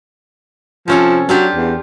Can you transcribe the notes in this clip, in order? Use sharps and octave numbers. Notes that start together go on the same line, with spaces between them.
C3 F3 C#4 A4
F#3 D4 F4 G4
E2